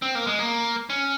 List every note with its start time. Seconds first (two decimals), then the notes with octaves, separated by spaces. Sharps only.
0.02 C4
0.15 A#3
0.27 G#3
0.39 A#3
0.90 C#4